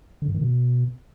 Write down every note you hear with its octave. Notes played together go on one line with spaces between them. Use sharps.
D3
G#2
D#3
B2